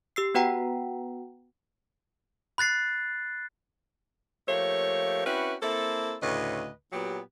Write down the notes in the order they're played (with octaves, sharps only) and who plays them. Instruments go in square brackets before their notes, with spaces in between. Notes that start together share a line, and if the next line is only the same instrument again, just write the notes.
[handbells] G4 E6 C7
B3 F#4 B4 F#5 G5 A#5
[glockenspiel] B5 F#6 A6 C7
[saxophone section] F3 A3 A#3 G4 C#5
C4 C#4 E4 F#4 B4
A#3 C4 E4 A4
D2 A2 C#3 B4 D#5
A#2 F#3 B3 G4